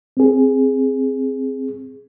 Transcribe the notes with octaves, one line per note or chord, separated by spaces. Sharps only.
C4 G#4